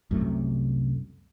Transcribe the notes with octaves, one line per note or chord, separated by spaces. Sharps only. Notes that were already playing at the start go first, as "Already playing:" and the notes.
C2 F#2 C3 A3